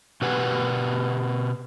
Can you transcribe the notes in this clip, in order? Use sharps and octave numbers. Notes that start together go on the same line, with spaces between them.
B2 G4 B4 F#5 G#5